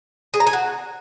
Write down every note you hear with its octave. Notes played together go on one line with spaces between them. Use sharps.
G#4
A#5
G#5
F#4